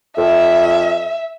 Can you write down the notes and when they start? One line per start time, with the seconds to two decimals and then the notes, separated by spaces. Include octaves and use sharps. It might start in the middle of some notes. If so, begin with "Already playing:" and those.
0.17 F2 E5